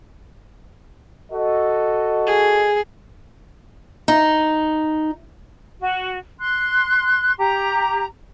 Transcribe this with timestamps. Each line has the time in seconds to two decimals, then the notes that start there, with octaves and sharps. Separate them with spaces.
1.32 F#4 A4 D#5
2.27 G#4
4.08 D#4
5.79 F#4
6.40 C6 F#6
7.38 G4 A#5